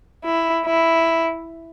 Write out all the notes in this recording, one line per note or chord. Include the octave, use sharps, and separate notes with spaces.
E4
E4